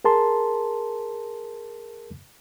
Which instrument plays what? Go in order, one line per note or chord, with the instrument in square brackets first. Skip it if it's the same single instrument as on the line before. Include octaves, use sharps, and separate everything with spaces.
[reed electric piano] G#4 A#4 A5 C6